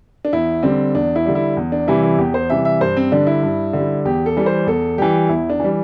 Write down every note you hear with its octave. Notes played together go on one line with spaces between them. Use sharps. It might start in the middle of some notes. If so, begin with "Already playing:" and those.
D4
E2 E4
D3 G3 C4
E2 D4
E4
D3 G3
E4
E2
D4
C3 E3 G3 E4
E4
E2 G4
C5
C3 E3 G3 E5
E5
G2 C5
C4
D3 G3 D4
E4
G2
D3
G3
E2 G4
A4
E3 G3
C5
E2 A4
E3 G3 G4
E2 E4
D4
E3 G3